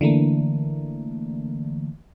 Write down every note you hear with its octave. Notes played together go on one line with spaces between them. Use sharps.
D3 E3 A3 A#3